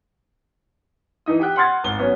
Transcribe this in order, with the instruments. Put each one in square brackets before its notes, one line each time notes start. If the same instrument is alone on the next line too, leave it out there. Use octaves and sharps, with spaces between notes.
[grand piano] E3 D#4 D#6
G4 G5 F#6
F#5 B5 C6 F6 G#6 A6
G#1 G7
F#3 B3 C#4